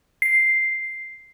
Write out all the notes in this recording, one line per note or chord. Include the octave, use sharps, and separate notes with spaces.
C7